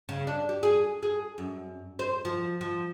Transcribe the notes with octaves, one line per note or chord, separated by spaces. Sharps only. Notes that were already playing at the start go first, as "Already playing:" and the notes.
C#3
D4
G4
G#4
G#4
F#2
C5
F3
F3